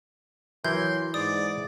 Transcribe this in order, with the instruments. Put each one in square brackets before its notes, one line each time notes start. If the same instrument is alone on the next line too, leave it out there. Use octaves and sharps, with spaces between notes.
[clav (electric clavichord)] E3 A#4 [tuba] F#3 [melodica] C6 [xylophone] G6 G#6
[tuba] G#2 [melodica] D5 [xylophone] D#6